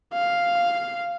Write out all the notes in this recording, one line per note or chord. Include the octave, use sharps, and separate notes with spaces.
F5